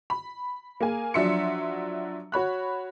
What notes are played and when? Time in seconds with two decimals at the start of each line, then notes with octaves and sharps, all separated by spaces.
0.10 B5
0.81 A#3 G#4 G#5
1.14 F3 F#3 D4 E5 C6 C#7
2.32 F#4 C#5 B5 F#6